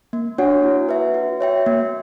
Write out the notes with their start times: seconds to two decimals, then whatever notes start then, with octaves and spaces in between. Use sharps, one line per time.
0.13 A#3
0.38 D4 F#4 C#5 F#5
0.64 E4
0.89 B4 E5
1.14 F#4
1.41 C#5 E5 G5
1.66 A#3